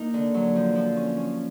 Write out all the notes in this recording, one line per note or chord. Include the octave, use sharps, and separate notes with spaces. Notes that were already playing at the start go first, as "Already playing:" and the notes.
Already playing: A#3 D#4
D3
F#3
F3
F3
C#4
C#4